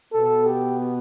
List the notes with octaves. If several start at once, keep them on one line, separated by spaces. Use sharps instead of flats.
B2 B3 A4
G4